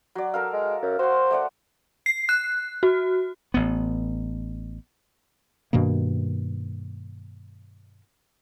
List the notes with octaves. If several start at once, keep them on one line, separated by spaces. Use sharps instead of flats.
F#3 D5
A4 A#4 F5
G#3
F#2
F#4 C5 C6
A3 D5 F#5
C7
F#6
F#4
A1 B3
G2 B2 D#3 A#3